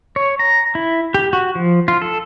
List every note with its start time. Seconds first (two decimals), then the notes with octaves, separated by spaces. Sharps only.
0.16 C#5
0.39 A#5
0.75 E4
1.14 G4
1.33 F#4
1.55 F3
1.88 F4
2.02 A4